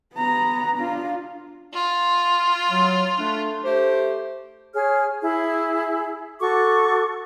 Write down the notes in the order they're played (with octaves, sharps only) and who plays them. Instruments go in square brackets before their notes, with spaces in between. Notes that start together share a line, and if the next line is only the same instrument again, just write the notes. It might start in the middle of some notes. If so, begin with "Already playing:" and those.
[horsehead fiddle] B3 A#5
D4 F4
[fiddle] F4
[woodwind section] F#3
A3 D4
A3 G4 C5
[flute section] G#4 C#5 F6
E4 G#4
F#4 A4 C#6 D6